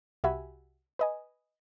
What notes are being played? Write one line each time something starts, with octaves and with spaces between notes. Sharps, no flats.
C2 F#4 G4 E5 G#5 B5
B4 D#5 G#5